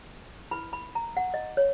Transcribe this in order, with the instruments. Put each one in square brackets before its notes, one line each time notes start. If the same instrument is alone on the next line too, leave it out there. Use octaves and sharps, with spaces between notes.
[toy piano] E4 B4 B5
B5
A#5
F#5
D#5
C#5